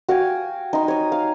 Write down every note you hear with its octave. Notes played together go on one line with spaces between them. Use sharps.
F#4 F5 G5 G#5
D#4 C6
C#5 D#6
F5